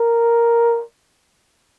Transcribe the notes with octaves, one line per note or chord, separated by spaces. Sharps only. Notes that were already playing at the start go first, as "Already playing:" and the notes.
Already playing: A#4